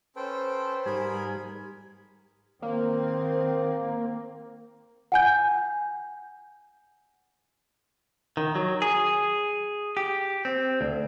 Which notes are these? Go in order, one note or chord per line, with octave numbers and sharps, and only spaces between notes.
C#4 A4 B4 C5 G5
G#2 G3 G#4 A#4 G#5 B5
D#3 A#3 C4
F#5 G#5 G6
D#3
F#3
G#4
G4
C4
D2